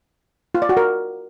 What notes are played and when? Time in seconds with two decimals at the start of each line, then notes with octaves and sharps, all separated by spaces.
0.55 F4
0.62 D5
0.69 F#4
0.77 A#4